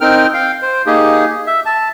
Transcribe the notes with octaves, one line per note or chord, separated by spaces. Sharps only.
C4 D#4 A#4 G5 F6
F5 G5
C5
A#3 D#4 G4 G#4
E5
A5